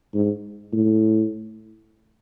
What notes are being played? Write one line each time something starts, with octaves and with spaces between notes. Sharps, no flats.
G#2
A2